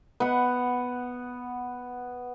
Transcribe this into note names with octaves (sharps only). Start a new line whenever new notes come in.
B3 F#5